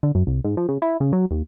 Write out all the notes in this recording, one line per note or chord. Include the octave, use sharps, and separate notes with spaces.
D3
F#2
C2
G#2
F3
C#3
E4
C#3
F#3
D#2